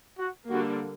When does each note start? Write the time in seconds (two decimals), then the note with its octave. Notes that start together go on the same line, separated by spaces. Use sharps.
0.19 F#4
0.49 D3 G3 A#3 F#4